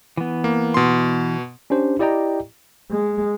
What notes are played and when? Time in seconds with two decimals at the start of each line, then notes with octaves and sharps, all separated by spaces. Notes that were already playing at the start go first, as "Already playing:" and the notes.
0.17 E3 B3
0.44 A#3
0.74 B2 C6
1.70 C#4 D4 G4 C5
1.99 E4 G4 D5 D#5 G5 A#5
2.91 G#3